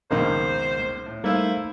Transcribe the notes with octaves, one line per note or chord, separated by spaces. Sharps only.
C#2 F#2 B2 D#3 A#3 C5
A2
G3 A3 A#3 D#4 E4 A4 C5 F5